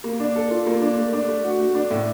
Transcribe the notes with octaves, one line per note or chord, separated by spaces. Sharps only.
A#3
D4
A4
F4
A#3
D4
A3
D4
A3
F#4
A3
D4
A2